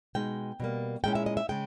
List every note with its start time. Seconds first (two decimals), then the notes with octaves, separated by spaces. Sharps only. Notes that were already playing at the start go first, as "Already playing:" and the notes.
0.15 B2 G#3 D#4 G5
0.60 B2 G3 A#3
1.04 A#2 G#3 C#4 E4 G5
1.15 E5
1.26 D#5
1.37 E5
1.49 C#3 G#3 G5